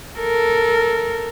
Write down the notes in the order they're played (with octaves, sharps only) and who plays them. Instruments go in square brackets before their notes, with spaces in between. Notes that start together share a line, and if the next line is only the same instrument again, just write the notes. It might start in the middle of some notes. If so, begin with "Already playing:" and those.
[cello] A4 A#4